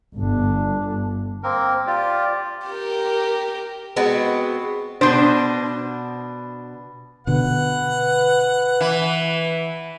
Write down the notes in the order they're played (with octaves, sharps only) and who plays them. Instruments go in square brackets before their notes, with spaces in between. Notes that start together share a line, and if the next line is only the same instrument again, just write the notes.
[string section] G1 [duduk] D4
[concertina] A#3 C4 A#4
F4 G4 D5
[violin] G4 A#4
[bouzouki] G#3 B3 C4 F#4
[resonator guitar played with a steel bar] B2 D4 [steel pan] C5
[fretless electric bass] B2 D3 [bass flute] B4 [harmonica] F#5
[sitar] E3